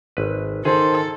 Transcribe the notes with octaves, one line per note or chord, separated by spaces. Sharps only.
G#1 B4
D#3 G#4 A4 C5